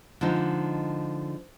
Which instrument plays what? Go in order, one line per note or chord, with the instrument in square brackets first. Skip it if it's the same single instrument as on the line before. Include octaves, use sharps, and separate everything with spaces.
[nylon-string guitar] D3 F3 G#3 D#4